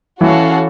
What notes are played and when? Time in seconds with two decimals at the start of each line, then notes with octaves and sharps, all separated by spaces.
0.20 E3 C#4 F#4 A4 C#5 F5